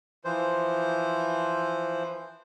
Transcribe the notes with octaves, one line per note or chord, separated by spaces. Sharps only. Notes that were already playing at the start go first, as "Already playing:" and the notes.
E3 F3 C5